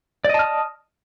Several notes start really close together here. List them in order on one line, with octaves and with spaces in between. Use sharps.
D5 D#5 A5 F6 D#6